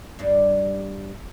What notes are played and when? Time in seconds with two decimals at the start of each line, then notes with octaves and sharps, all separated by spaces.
0.19 G2 G3 D4